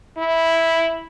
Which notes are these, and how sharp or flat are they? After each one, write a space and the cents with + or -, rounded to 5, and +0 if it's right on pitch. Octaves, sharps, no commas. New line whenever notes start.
E4 -5